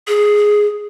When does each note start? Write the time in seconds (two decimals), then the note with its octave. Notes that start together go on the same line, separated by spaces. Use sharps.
0.08 G#4